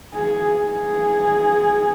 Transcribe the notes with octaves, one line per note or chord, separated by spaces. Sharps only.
G#4
G#4